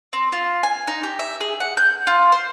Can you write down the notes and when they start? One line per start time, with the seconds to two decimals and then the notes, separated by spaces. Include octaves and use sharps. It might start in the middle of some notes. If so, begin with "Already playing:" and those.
0.13 C4
0.32 F4
0.63 G#5
0.87 D#4
1.03 G4
1.19 E5
1.41 G#4
1.60 F#5
1.77 G6
2.07 F4
2.32 C5